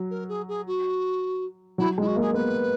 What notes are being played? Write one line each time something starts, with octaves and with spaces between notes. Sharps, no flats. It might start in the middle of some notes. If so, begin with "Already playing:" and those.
Already playing: F#3
A#4
G#4
G#4
F#4
F#3 E4
G#3
E4
F#4
A#3
G#4
B3 B4